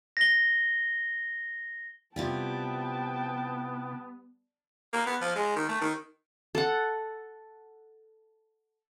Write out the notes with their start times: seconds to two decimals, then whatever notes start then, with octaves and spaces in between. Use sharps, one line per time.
0.17 A#6 G7
2.16 C3 G3 B3 E4 F4 G5 A5
4.93 A#3
5.06 B3
5.21 F3
5.36 G#3
5.56 D#3
5.69 A3
5.81 D#3
6.55 A4 F#5